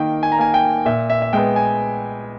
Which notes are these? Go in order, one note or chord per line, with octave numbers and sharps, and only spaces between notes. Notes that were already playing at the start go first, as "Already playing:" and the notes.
Already playing: D#3 A#3 G5
G#5
A#5
A#3 G#5
G5
A#2 E5
E5
E5
G#3 B3 G5
G#5